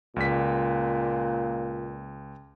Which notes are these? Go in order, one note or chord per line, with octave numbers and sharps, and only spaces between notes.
C#2 A#2 B6